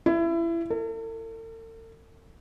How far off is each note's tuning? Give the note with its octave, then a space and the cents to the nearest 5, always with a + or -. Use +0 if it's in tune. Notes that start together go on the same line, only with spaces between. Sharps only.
E4 +25
A4 +45